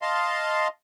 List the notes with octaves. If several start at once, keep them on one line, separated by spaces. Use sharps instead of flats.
D#5 F5 A5 C6